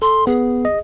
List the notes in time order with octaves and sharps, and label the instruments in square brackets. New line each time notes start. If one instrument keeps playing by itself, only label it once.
[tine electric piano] A4 [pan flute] C6
[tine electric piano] B3 [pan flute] G#4
[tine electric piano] D#5